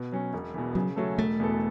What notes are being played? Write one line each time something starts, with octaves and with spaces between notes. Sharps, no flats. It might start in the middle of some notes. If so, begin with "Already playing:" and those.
Already playing: B2
F#3 C#4
E1
E2 B2
C#3 F#3
F#3 A3 C#4 A4
E1 A3
E2 B2 B3 A4